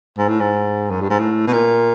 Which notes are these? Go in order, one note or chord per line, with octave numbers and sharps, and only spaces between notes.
G#2
A2
G#2
F#2
G2
G#2
A2
B2
A#2